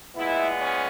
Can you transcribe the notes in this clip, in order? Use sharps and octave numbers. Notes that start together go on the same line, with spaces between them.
A#2 G#3 B3 E4
C#4